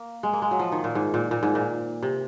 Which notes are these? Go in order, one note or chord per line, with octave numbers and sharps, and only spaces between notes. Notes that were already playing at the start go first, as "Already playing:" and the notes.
Already playing: A#3
G#3
A#3
G#3
F#3
F3
D#3
A#2
G#2
A#2
A#2
G#2
A#2
C3